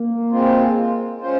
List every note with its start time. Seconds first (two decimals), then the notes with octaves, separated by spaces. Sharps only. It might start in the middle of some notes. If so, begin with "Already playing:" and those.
Already playing: A#3
0.31 G#3 C4 F4
1.21 G#3 C#4 F4 C5